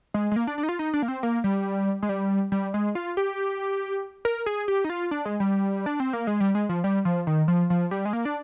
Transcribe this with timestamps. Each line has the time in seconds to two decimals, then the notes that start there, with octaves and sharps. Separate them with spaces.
0.14 G#3
0.32 G#3
0.36 A#3
0.47 D4
0.58 D4
0.63 D#4
0.69 F4
0.79 D#4
0.93 D4
1.02 A#3
1.08 C4
1.23 A#3
1.44 G3
2.03 G#3
2.09 G3
2.52 G3
2.74 G#3
2.95 F4
3.17 G4
4.25 A#4
4.46 G#4
4.68 G4
4.84 D#4
4.90 F4
5.11 D4
5.25 G#3
5.40 G3
5.86 D4
6.00 C4
6.13 A#3
6.27 G#3
6.40 G3
6.55 G#3
6.69 F3
6.84 G3
7.05 F3
7.27 D#3
7.48 F3
7.70 F3
7.91 G3
8.05 G#3
8.13 A#3
8.25 D4